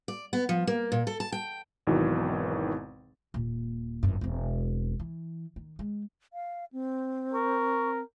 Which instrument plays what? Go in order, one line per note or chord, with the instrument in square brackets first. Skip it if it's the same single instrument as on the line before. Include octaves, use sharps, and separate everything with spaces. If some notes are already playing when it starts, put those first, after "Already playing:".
[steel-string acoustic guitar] D5
B3
F3
A#3
A#2
A4
A5
G5
[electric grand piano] G#1 E2 B2 D#3 E3 F#3
[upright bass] D#1 A#2
G1 F#2
E1 C4
E3
D#3
G#3
[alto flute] F5
C4
[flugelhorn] A#4 [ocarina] C#6